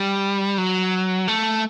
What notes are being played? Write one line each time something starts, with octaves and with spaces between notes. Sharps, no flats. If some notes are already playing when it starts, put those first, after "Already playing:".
Already playing: G3
F#3
A3